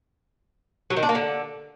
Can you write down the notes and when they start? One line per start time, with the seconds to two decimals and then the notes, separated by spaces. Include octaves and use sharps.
0.90 F#3
0.97 D#3
1.03 D4
1.09 A#3
1.15 D3